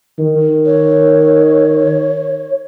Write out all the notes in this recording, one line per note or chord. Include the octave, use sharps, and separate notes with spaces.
D#3
C#5